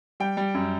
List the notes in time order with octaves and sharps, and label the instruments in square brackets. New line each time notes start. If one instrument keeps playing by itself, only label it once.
[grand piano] G3 G5
G3
F#2